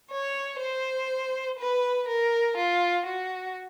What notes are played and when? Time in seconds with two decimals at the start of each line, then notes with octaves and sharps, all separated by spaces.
0.11 C#5
0.60 C5
1.59 B4
2.08 A#4
2.57 F4
3.06 F#4